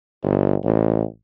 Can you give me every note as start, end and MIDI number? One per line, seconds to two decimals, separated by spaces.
0.23 0.55 31
0.64 1.03 33